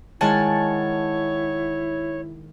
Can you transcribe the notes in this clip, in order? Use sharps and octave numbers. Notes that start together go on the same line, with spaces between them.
D#3 G#3 E4 C#5 F#5 G#5 A5